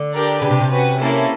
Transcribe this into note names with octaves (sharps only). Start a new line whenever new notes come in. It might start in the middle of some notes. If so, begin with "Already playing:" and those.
Already playing: D3
D4 G4 A#4 D5
C#3 D4 G4 B4
C3
C3
C#4 F#4 B4
A#3 C#4 E4 A4